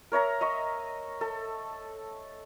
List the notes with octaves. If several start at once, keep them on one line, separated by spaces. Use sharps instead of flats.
A#4 C#5 E5 A#5
D#5 E5 C#6
A4